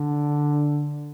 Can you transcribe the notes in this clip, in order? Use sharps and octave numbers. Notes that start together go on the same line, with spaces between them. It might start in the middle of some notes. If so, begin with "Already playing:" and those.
Already playing: D3